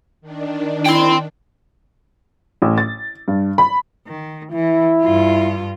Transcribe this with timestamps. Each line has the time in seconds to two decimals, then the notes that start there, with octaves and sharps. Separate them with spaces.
0.21 D#3 D4
0.86 E4 G5 C6
2.62 A1
2.78 A6
3.28 G2
3.58 B5
4.07 D#3
4.52 E3 E4
5.02 G2 F4